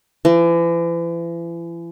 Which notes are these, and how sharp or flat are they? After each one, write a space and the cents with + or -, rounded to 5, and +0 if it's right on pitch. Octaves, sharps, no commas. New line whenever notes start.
E3 +40